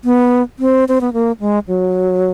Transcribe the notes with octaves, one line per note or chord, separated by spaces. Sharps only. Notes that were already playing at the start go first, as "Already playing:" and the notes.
B3
C4
C4
B3
A#3
G#3
F#3